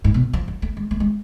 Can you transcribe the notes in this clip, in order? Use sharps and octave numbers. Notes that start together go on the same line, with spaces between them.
G#2
B2
F3
F#3
A3
G#3
A3
G#3